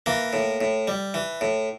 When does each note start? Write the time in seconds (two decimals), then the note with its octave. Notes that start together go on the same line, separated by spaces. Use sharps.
0.06 E3 A#3
0.33 A2
0.61 A2
0.88 G3
1.14 E3
1.41 A2